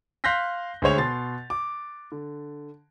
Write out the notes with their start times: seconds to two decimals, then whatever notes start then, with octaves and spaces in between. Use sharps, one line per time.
0.24 F5 C6 F#6 G6 A#6 B6
0.82 D2 G#3 C5 C#5 F7
0.98 B2 C6 A6
1.50 D6
2.12 D3